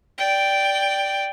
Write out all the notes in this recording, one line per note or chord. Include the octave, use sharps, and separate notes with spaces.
D5 G5